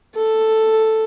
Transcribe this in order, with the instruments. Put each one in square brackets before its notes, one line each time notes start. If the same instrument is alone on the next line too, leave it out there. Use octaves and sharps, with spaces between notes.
[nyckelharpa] A4